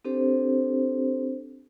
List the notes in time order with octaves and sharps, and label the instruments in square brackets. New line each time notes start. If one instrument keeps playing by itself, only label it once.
[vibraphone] C4 D4 G4 A4 C5